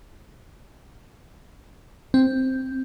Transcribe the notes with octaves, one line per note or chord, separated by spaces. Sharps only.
C4